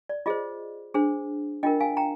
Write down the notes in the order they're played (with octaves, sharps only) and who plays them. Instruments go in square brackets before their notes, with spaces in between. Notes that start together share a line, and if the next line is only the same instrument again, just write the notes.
[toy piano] D5
F4 G#4 C5 D#5
D4 G#4 C5
D4 F4 A#4 D#5 G5
F5 G#5
G5 A#5